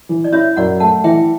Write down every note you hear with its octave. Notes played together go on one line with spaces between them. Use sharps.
E3
D5
E4 C#5 E5
F#2 D5 F#5
A3 F#5 A5
E3 E5 G5